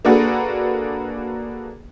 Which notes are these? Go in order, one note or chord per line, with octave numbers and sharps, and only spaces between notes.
A#3 D4 F#4 G#4 A4 B4